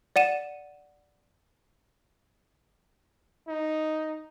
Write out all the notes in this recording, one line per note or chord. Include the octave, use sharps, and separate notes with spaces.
D5 F#5 D#7 E7
D#4